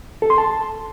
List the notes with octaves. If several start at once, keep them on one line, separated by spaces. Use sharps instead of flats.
A4
C6
A5